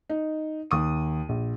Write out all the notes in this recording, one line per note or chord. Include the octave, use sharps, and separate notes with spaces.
D#4
D#2 D#6 D#7
A#1